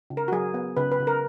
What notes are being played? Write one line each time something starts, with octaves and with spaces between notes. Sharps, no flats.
C#3
A#4
F#4
F#3 G#4
B3
C#3 B4
B4
C#3
A#4